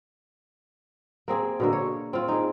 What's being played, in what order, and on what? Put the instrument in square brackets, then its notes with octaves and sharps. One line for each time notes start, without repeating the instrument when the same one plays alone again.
[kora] A#3 C4 G#4
B2 D3 A#3
C#5
C4 F4
D#4 G#4